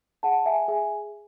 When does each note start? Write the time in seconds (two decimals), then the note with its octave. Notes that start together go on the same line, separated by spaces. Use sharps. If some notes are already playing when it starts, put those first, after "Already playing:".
0.23 G#4 F#5 A5
0.46 E5 G#5
0.68 G#4 E5 G#5